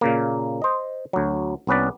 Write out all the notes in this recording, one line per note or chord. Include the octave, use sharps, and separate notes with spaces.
A#2 C#3 A#3
C5 D#5
D2 F#3
C2 B3 C#4 B4 D5